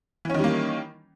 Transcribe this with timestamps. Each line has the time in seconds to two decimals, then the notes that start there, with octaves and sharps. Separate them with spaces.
0.25 E3
0.30 C#4
0.34 D#3
0.39 G3
0.44 A#3